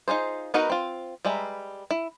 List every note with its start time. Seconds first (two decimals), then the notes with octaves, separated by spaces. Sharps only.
0.08 D#4 F4 G#4 C5
0.54 B3 D#4 F#4 A#4 B4
0.70 C4 F4
1.25 G3 G#3 B4 E5 A#5
1.91 E4